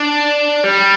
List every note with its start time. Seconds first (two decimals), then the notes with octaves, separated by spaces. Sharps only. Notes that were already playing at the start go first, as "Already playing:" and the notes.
Already playing: D4
0.64 G3